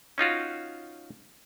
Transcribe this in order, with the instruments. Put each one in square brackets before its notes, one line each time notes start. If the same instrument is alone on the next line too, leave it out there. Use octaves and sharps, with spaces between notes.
[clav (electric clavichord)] C#4 D#4 F4 F#4